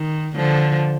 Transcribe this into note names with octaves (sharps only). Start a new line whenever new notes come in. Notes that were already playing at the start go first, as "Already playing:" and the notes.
Already playing: D#3
D3 F3